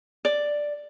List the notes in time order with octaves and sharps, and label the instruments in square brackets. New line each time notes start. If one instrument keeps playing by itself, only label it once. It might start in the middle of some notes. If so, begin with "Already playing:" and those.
[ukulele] D5